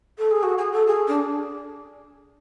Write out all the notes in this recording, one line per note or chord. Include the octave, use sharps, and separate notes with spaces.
A4
G#4
F#4
G#4
A4
G#4
D4